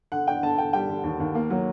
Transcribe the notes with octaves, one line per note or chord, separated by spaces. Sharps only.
D3 F#5
D4 G5
D3 A5
D3 G5
G3 G5
D3
D#2
D#2
A#3
F#3